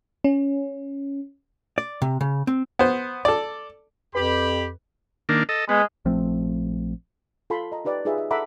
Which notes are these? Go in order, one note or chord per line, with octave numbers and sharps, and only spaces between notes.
C#4
D5
C3
C#3
C4
B3 C5
A4 D5
F2 G4 B4 B5
D#3 A#3 D4
A4 D#5
G#3 B3
A#1 F3 A3 C4
F4 A4 A5 B5 C6
D#5 A#5
D#4 G4 B4 D5
D#4 F4 G#4 B4 E5
E5
A4 E5 F#5 A#5 B5 D6